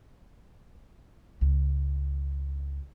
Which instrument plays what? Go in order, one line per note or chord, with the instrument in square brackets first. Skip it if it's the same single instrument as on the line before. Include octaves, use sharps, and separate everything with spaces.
[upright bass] C#2